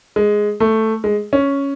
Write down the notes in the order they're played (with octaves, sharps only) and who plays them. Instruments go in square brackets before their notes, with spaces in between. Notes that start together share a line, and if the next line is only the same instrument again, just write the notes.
[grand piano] G#3
A3
G#3
C#4